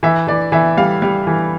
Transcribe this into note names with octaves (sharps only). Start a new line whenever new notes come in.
E3 E5
E3 D5
E3 E5
G3 F5
G3
E3